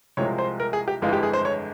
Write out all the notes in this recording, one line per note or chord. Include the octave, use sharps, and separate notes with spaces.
C2 C3 F3 G#3 C#5
C5
A#4
G#4
G4
G1 F2 E3 G#3 F4
G4
G#4
C5
C#5